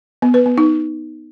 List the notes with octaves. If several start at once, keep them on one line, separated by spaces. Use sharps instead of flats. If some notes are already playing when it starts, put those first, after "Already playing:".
B3
B4
B3
D#4